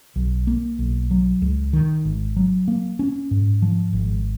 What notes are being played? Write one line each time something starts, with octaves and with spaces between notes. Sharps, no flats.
B1
A#3
B1
F#3
C#2
D#3
G#1
F#3
A#3
C#4
G#2
F3
G#1